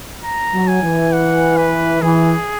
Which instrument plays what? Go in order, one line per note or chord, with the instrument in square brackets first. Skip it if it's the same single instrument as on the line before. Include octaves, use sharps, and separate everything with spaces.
[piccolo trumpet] A#5
[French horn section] F#3
[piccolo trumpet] G#5
[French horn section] E3
[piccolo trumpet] F#5
B4
[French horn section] E3 [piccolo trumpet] G#4